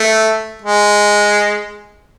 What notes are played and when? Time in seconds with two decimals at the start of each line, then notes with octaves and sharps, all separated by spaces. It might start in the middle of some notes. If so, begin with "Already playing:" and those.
Already playing: A3
0.62 G#3